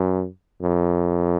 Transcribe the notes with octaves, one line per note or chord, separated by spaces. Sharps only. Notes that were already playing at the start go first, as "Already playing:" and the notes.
Already playing: F#2
F2